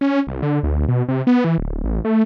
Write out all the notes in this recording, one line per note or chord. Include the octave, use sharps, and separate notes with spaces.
C#4
C2
D3
D2
B2
C3
B3
E3
D1
A1
A3